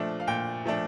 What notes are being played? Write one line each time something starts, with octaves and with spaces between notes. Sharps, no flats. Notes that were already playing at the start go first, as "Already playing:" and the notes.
Already playing: A#2 F3 A3 D4
F5
A#2 G5
F3 A3 D4